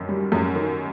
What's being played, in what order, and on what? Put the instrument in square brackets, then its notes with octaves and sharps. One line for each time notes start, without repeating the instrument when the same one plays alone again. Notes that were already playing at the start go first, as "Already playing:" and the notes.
Already playing: [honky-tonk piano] F#2 D#3
G3
F#2
D#3